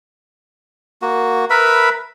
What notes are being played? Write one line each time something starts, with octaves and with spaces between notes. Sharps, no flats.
A#3 F#4
A#4 B4 E5 B5